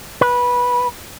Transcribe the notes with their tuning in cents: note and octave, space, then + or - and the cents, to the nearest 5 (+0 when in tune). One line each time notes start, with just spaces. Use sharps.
B4 -15